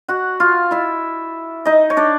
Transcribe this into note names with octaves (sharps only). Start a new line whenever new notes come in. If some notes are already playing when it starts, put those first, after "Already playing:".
F#4 F#5
F4 F5
E4 E5
D#4 D#5
C#5
D4 D5